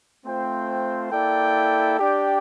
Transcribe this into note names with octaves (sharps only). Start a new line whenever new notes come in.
A3 C4 F4 C5 G5
A#3 E4 A4 D5 G5
D4 G4 D5 G5